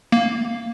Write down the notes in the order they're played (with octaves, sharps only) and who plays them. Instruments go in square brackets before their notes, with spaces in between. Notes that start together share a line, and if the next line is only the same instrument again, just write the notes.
[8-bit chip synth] A#3